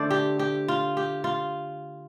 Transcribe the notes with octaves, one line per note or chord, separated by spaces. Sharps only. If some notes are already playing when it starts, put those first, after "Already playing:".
Already playing: D3 A3 D4 C5 D5
G4
G4
F4
G4
F4